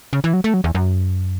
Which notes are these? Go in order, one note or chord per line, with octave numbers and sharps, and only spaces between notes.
C#3
E3
F#3
A3
F#3
E2
F#2